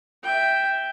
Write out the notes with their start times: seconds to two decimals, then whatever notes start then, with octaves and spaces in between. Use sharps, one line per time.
0.23 E5 G5